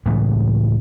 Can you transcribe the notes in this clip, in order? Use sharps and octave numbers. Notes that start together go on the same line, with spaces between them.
C#2 A2 E3 B3